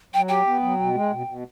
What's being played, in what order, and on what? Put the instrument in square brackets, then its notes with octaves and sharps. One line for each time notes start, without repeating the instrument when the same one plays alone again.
[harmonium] F#3 [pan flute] G5
[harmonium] G4 [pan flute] G5
[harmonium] B3
F#3
B2
G#3
B2
B2